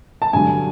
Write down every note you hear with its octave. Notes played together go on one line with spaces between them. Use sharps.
A5
G2 D3 F#3 G#5